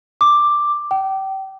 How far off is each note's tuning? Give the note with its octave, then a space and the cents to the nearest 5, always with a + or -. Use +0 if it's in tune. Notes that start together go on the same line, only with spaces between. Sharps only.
D6 +5
G5 -30